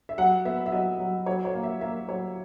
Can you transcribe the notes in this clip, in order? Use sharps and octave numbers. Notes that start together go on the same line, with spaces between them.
E5
F#3 F#5
B3 E5
E5
F#3 D#5
F#3
F#3 C#5
C#5
A#3
E5
A#3 E5
F#3 C#5